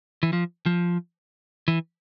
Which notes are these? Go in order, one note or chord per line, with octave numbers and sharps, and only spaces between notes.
E3
F3
F3
E3